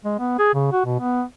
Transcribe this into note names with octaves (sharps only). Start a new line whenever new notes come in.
G#3
B3
G#4
C#3
F#4
B2
B3